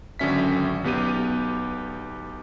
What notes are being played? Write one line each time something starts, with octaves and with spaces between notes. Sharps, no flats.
G#1 D3 F#3 C#4 E5 B6
B1 B3 G4 D#7